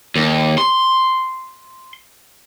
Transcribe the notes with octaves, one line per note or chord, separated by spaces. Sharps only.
D#2
C6